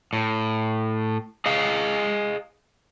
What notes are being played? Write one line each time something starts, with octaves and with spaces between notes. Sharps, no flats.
A2
G#4 D#5 F5